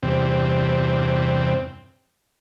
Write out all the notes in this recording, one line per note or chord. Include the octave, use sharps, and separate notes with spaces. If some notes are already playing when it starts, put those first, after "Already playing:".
E2 G2 C3 C4